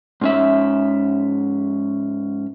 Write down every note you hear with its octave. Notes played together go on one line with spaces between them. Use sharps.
G#2 C#4 E5